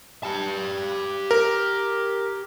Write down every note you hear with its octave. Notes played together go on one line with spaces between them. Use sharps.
G4 A5
A#4